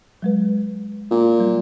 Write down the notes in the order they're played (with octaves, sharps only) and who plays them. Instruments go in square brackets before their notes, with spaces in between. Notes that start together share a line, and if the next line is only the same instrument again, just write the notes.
[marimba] F#3 G#3 B4
[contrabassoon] A#2
[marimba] F#3 G3